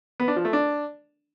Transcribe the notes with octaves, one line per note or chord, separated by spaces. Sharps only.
B3
D4
F3
A3
D4